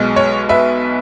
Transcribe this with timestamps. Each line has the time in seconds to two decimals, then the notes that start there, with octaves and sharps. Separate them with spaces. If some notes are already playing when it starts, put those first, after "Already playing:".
Already playing: B1 B2 G#3
0.16 C#5
0.49 B4 E5